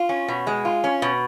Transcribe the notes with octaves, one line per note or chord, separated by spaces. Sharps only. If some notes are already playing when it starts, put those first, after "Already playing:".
Already playing: F4
C#4
B2
G#3
F4
C#4
B2